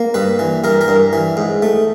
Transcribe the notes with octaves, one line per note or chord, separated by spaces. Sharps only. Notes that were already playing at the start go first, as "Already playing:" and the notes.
Already playing: A#3
G2 B4
E3
G2 A#4
A#4
G2
E3
G#2
A3